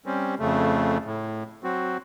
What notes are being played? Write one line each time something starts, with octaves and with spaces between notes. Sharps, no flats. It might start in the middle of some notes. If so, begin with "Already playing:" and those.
G3 C4 C#4
F2 C#3 A3
A2
F#3 C4 F#4